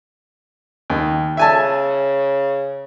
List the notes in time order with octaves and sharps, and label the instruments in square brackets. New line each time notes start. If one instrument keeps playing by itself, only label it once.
[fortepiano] D#2
[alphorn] C#3 [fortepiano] E5 G#5 A5